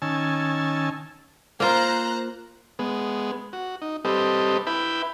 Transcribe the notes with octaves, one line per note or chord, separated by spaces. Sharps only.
D#3 C#4 G#5 A5 E6
A#3 F4 C5 A#5 F#6
G#3 B3
F#4
D#4
G3 C4 G4 A4 B4 D#5
E4 B4 G5 B5